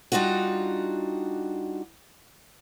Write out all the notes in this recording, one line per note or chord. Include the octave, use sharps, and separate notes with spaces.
G3 D4 D#4 F4 F#4